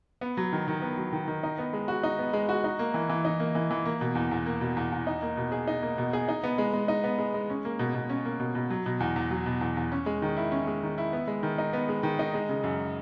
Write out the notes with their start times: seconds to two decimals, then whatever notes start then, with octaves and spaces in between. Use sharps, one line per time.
0.21 B3
0.37 F#3
0.52 D#3
0.68 D#3
0.82 B3
0.98 F#3
1.13 D#3
1.28 D#3
1.43 D#4
1.58 B3
1.73 G#3
1.88 F#4
2.03 D#4
2.19 B3
2.33 G#3
2.49 F#4
2.64 D#4
2.79 A#3
2.94 E3
3.09 E3
3.25 D#4
3.40 A#3
3.55 E3
3.70 E3
3.86 A#3
4.01 B2
4.15 E2
4.31 E2
4.46 A#3
4.61 B2
4.77 E2
4.92 E2
5.07 D#4
5.22 A#3
5.37 B2
5.52 G#4
5.67 D#4
5.82 A#3
5.98 B2
6.13 G#4
6.28 D#4
6.43 B3
6.58 G#3
6.73 G#3
6.88 D#4
7.04 B3
7.19 G#3
7.34 G#3
7.49 C#4
7.65 A#3
7.79 B2
7.94 B2
8.09 C#4
8.25 A#3
8.39 B2
8.55 B2
8.70 F#3
8.86 B2
9.00 E2
9.16 E2
9.31 F#3
9.46 B2
9.61 E2
9.77 E2
9.92 C#4
10.06 G#3
10.22 D#3
10.37 E4
10.52 C#4
10.67 G#3
10.83 D#3
10.98 E4
11.13 B3
11.28 G#3
11.43 D#3
11.58 D#4
11.73 B3
11.89 G#3
12.03 D#3
12.19 D#4
12.34 G#3
12.49 C#3
12.64 F#2